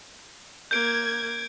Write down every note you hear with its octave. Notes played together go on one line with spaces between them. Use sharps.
A#3 G6 G#6 D7